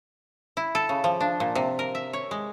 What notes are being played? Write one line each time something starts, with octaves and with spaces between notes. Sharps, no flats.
E4
A4
C#3
F3
D4
A#2
C3
A#4
E5
C#5
G#3